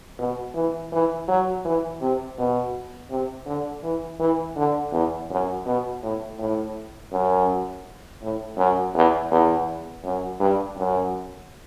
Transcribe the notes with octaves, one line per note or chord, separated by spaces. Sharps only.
B2
E3
E3
F#3
E3
C3
B2
C3
D3
E3
E3
D3
E2
F#2
B2
A2
A2
F#2
A2
F#2
E2
E2
F#2
G2
F#2